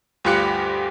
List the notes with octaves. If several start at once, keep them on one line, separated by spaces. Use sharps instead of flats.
D2 G2 F4 G4 F#6 C#7